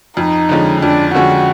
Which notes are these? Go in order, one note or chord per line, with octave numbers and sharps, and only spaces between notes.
F2 D#4
D3 F3 G#3 C#4
F2 D4
D3 F3 G#3 C#4 F#4